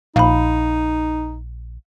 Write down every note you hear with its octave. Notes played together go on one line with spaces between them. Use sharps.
A#1 D#4 F5 B5